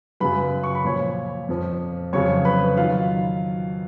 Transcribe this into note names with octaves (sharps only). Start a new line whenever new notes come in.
F#2 C#3 F#3 B4 B5
C#6
B5
A#2 F3 C#5 C#6
F2 F3
F2 C#3 F#3 C#5 C#6
B4 B5
D#3 F#3 F4 F5